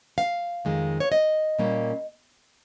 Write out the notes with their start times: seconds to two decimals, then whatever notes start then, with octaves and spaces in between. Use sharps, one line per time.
0.18 F5
0.65 F2 D#3 G#3
1.00 C#5
1.12 D#5
1.58 A#2 G3 A#3 C#4